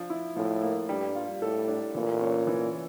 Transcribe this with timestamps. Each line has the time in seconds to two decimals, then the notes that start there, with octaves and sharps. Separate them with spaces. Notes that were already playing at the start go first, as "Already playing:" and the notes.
Already playing: F3 D4
0.10 E4
0.36 A2 F3
0.62 A#3
0.88 G2 G3
1.15 F4
1.42 A2 A4
1.68 D4
1.95 A#2 E3
2.21 C#4
2.47 E3